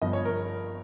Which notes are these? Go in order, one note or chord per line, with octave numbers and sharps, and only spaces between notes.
G1 G2 F3 D#5
C#5
A#4